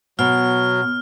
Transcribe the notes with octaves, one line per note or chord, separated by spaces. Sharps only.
B2 F#3 F6